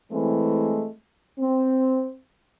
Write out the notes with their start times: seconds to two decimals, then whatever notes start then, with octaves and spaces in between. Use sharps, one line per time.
0.12 E3 G#3 A3 C4
1.39 C4